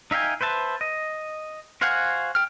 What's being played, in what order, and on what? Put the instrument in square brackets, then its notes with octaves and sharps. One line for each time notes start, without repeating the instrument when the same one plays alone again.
[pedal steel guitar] D#4 E5 F5 G5 G#5
B4 C5 E5 A5
D#5
F#4 C5 F5 F#5 G#5
G5 F6